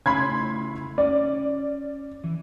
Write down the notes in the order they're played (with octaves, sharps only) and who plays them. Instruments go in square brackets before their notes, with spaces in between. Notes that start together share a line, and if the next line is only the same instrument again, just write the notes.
[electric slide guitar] C#3 A3 E4 [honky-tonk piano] B5 C6 G#6
[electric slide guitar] C#4 [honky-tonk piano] D5
[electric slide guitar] E3